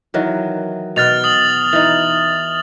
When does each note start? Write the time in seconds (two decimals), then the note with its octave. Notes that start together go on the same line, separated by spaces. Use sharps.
0.14 D#3 E3 F#3
0.96 B2 B4 F6 A6 F7
1.24 D#6 F#7
1.73 E3 D#4